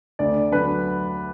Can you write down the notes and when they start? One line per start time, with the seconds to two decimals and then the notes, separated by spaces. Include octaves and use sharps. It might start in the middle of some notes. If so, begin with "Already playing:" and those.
0.19 D2 D5
0.52 D3 F#3 B4